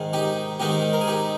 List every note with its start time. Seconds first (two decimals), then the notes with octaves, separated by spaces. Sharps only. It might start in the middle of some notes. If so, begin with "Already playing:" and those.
Already playing: G#2 D#3 G#3
0.13 D#4 G4
0.60 G#2 D#3 G#3 D#4 G4
0.93 A#4
1.00 G#4
1.07 D#4 G4